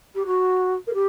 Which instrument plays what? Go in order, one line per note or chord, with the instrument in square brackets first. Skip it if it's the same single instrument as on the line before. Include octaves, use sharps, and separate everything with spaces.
[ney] G4
F#4
A#4
G4